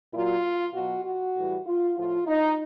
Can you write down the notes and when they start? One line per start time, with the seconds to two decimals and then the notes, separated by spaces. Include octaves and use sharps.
0.13 A#2 F#3 F4
0.73 B2 F#3 F#4
1.05 F#4
1.35 A2 E3 G3
1.66 F4
1.96 A2 F3 F4
2.26 D#4